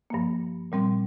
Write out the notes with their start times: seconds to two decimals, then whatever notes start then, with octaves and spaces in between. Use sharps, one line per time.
0.10 G2 F3 A#3
0.72 A#2 G3 C4